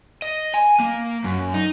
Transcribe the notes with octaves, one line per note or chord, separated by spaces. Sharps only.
D#5
G#5
A#3
F#2
D#4